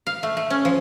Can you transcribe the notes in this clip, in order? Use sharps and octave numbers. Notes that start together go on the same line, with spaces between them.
F5
A3
A3
C#4
F3